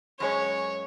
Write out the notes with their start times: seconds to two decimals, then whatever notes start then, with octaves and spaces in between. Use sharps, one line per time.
0.20 F#2 G#3 C#4 C#5